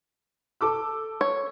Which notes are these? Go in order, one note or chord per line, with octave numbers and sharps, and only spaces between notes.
A4 D6 E6
C#5